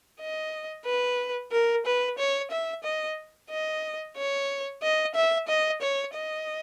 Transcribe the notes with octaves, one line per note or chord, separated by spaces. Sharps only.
D#5
B4
A#4
B4
C#5
E5
D#5
D#5
C#5
D#5
E5
D#5
C#5
D#5